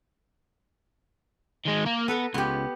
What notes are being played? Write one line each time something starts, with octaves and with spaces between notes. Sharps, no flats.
D#3 G#3
A#3
B3 A4 B4 A#5
C#2 B3 G4